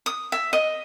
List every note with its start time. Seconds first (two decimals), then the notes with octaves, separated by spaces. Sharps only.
0.06 D#6
0.32 E5
0.53 D#5